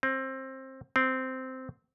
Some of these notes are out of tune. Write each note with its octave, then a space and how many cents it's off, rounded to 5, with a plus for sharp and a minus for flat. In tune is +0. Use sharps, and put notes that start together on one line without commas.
C4 +20
C4 -10